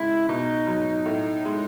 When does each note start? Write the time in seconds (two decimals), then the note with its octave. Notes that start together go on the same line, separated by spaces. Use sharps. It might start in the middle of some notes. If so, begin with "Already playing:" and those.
Already playing: C#3 G#3 E4
0.29 B2 D#4
0.67 F#3
1.06 A2
1.45 G#3